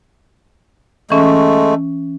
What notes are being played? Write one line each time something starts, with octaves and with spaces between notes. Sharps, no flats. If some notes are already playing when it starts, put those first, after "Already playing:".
E3 G#3 A3 C#4